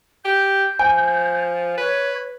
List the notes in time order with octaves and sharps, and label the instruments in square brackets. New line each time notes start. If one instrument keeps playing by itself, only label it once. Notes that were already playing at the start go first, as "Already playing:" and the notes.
[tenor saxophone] G4 [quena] G6
[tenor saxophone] F3 [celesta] G#5
[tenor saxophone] B4 [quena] C#5